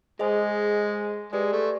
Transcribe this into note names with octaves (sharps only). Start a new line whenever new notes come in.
G#3 G#4 C5 D#5 G#5
G#3 G4 B4 D5
A3